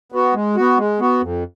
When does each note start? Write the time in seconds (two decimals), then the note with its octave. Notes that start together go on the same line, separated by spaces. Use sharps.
0.12 B3 F#4
0.34 G#3
0.56 B3 F#4
0.78 G#3
1.00 B3 F#4
1.22 F2